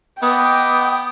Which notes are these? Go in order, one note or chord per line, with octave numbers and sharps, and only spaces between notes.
B3 D#5 G5 D6 D#6